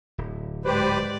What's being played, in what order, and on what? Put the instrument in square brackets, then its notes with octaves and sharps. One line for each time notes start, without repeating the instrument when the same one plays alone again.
[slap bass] D1
[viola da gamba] G#2 D5 [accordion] G4 C5 [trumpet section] B4